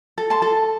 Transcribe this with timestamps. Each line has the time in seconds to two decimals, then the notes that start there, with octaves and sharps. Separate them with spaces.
0.18 A4
0.30 A5 C6
0.42 A4